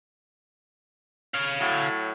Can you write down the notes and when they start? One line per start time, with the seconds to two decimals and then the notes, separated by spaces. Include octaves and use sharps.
1.34 C#5 F5
1.59 A2 F#3